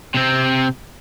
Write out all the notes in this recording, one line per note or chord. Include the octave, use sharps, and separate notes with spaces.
C3 C4